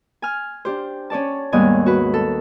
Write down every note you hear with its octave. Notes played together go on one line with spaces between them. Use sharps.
G#5 F6
D4 G4 C5
C#4 C#5 D5 A5
D#2 G#2 G3 G#3 B3 G#5
F#4 B4
A4